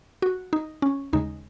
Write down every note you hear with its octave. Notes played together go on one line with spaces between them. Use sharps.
F#4
D#4
C#4
D#2 C#3 G#3 D#4